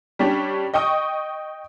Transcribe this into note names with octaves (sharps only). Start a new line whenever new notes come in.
G3 C#4 D4 G4
D#5 G5 C#6 D#6